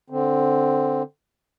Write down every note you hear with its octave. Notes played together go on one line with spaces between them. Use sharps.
D3 C4